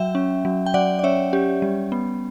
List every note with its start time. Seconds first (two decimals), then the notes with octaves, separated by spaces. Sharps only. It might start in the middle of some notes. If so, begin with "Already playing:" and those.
Already playing: F#3 E5 G5
0.15 C#4
0.45 F#3
0.66 G5
0.74 F#3 D5 F#5
0.99 D5
1.03 C#4 C#5 E5
1.33 C#4 G4
1.62 G3
1.92 B3